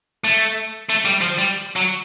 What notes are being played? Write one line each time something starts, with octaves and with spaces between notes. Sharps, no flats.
A3
A3
G3
F3
G3
F#3